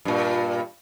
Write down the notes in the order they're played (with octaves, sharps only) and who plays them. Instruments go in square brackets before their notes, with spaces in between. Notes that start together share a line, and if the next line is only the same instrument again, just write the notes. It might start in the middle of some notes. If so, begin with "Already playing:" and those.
[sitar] G2 A#2